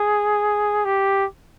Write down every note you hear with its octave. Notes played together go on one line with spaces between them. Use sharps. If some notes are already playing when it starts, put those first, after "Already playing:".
Already playing: G#4
G4